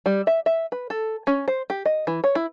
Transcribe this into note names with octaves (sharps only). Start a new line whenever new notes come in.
G3
E5
E5
B4
A4
C#4
C5
G4
D#5
E3
C#5
E4